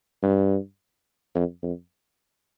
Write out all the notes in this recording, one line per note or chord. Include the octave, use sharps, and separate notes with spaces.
G2
F2
F2